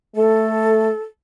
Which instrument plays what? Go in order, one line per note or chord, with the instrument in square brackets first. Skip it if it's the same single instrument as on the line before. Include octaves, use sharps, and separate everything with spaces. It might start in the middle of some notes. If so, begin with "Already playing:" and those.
[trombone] A3 [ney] A4